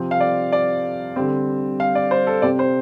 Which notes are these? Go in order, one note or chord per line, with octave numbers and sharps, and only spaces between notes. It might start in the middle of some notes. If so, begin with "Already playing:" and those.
Already playing: C3 F3 C4
F5
D5
D5
D3 G3 C4
F5
D5
C5
A4
C3 G3 C4 D5
C5